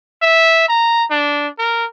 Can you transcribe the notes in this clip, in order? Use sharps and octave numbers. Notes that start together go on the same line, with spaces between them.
E5
A#5
D4
A#4